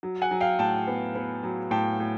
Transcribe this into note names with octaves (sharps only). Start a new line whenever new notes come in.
F#3
F#5 G#5
F#3
F5 G5
A2 G5 A5
B3
B3
F#3
A2 G5 A5
A2